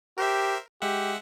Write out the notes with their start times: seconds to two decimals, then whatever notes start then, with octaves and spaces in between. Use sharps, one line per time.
0.18 G4 A#4 C5 E5
0.82 G#3 G4 E5 F#5